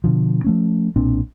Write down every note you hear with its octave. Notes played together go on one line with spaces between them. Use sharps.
B2 D3 F3
F3 A3 C#4
B1 A#2 C4 D4